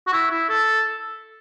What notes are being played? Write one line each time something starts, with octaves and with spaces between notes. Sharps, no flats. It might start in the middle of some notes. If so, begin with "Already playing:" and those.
F#4
E4
E4
A4